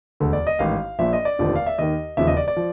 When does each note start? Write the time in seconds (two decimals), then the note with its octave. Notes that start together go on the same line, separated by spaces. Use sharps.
0.20 E1 D2 D3 A4
0.33 D5
0.47 D#5
0.59 A1 G#2 D#3 F5
0.99 A#1 A#2 F3 E5
1.13 D#5
1.25 D5
1.39 F1 D#2 D3 F3
1.55 F5
1.66 E5
1.78 D#2 D#3 D#5
2.17 E1 D#2 C#3 F3 E5
2.27 D#5
2.37 D5
2.48 D5
2.56 F3